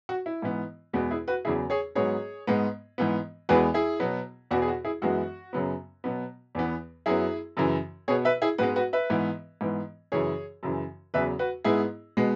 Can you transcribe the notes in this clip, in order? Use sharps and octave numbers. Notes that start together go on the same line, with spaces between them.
F#4
E4
G#2 E3 B3
E2 B2 G#3 B3 F#4
E4 G#4
F#4 B4
E2 C#3 F#3 E4 G#4
G#4 C#5
G#2 F#3 B3 G#4 C#5
G#2 G#3 B3
G#2 E3 B3
E2 E3 G#3 B3 F#4 B4
E4 G#4
B2 F#3 B3
E2 B2 B3 F#4
G#4
F#4
E4 G#4
F#2 E3 G#3 B3 F#4
F#2 C#3 F#3 B3
B2 F#3 B3
E2 E3 B3
F#2 F#3 B3 E4 G#4
F#2 C#3 E3
B2 B3 G#4 C#5
B4 E5
E4 G#4
G#2 G#3 B3 F#4 B4
F#4 B4
B4 E5
G#2 E3 B3
G#2 E3 B3
F#2 C#3 E3 G#4 C#5
F#2 C#3 E3
E2 C#3 F#3 B4 E5
F#4 B4
G#2 G#3 B3 E4 G#4
B2 G#3 B3